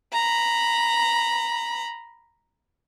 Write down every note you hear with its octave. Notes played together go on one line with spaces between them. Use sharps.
A#5 B5